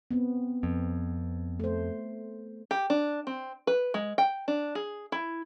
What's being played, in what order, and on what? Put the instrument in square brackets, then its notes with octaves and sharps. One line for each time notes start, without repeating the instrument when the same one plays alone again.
[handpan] B3 C4
[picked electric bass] F2
[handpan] A3 C5
[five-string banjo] G4
D4
C4
B4
G#3
G5
D4
G#4
E4